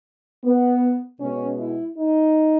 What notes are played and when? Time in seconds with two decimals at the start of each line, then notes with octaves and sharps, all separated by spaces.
0.44 B3
1.21 B2 G#3 B3 C#4
1.59 E4
1.99 D#4